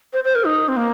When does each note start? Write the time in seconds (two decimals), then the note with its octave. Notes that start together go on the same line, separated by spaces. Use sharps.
0.13 C5
0.24 C5
0.35 A#4
0.45 D#4
0.68 C4
0.77 A#3